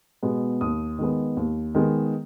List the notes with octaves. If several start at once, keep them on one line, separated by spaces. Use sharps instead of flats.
B2 G#3 B3
D#2 D#6
D#3 G#3 B3
D#2
D#3 G#3 B3